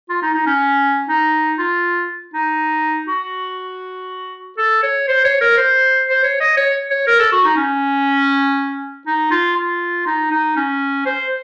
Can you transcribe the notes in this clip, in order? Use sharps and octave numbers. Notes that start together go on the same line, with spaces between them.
F4
D#4
D#4
C#4
D#4
F4
D#4
F#4
A4
C#5
C5
C#5
A#4
C5
C5
C#5
D#5
C#5
C#5
A#4
A4
F#4
D#4
C#4
D#4
F4
F4
D#4
D#4
C#4
C5